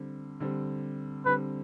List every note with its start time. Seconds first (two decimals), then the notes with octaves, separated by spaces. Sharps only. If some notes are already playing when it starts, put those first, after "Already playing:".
Already playing: D3 G3 C4
0.40 D3 G3 C4
1.26 D3 G3 C4 B4